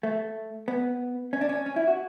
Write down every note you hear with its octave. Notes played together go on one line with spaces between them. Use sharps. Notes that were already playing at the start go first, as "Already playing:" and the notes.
A3
B3
C#4
D4
C#4
C#4
E4
F#4